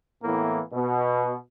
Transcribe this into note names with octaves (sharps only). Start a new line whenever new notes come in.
A2 E3 A#3 B3
B2